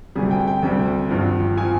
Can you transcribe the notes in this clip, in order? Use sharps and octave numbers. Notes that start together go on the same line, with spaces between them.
D2 C3 G3 G#4
G5
G5
D2 C3 G3
G#1 G2 F3
F3 G#5